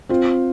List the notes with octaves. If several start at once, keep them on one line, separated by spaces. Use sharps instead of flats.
C4 F4